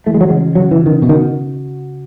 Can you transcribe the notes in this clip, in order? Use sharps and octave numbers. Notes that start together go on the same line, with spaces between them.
E3 A3
G#3
F#3
C#3 G#3
C#3 F#3
E3
C#3
D#3
B2 F#4
D#3